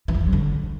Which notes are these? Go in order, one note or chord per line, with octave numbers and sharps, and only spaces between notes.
E3
E2
E3
F#3
D3